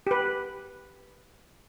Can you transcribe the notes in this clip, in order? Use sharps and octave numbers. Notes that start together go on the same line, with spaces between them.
G4 B4